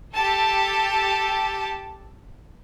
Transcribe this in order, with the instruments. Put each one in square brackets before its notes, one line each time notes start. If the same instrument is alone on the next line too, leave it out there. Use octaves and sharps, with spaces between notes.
[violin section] G4 A4 A5